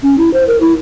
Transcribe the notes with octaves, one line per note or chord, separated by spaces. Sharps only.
C#4
E4
C5
A#4
E4